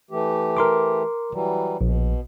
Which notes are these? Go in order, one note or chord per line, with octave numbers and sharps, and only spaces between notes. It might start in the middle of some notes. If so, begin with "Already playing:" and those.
E3 A3 G4
A#4 C6 D6
E3 F#3 G3
A#1 B2